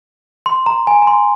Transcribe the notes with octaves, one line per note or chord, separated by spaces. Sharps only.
C6
A#5
G#5
A#5
C6